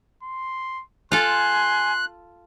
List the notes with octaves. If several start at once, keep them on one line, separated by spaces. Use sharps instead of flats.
C6
F4 A4 G#5 C6 F#6